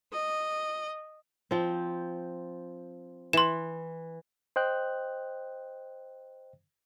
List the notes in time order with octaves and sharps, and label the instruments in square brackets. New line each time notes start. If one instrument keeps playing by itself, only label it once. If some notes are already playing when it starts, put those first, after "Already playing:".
[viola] D#5
[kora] F3 C4
[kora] E3 [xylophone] C6 E7
[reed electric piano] C5 D#5 G5 F#6